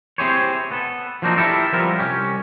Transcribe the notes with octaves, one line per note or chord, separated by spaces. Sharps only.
C4 E4 G4 G#4 C5 C#5
B3 A4
F3 F#3 A#3 C4 D4 D#4
E4 G4 A4 A#4
F3 G3 B3 C4 A#4
C2 C#4 G4